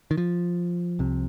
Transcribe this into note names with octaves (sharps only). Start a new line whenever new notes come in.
D#3
F3
C2 C3